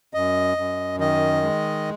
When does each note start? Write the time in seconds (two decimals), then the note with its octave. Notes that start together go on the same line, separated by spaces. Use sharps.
0.14 F#2 D#5
0.57 F#2
0.99 D#3 D#5
1.43 G#3